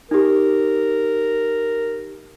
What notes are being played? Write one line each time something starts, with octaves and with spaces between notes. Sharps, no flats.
D#4 G4 A#4